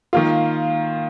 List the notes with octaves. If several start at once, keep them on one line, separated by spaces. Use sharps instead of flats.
D#3 A#3 F4